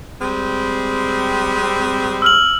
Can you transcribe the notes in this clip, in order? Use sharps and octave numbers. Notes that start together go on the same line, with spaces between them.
G3 G#3 C4
E6 F6 F#7